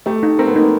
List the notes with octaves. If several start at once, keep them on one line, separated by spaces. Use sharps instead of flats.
A3 G4
D#4
C4 A#4
B3
A#3 D#4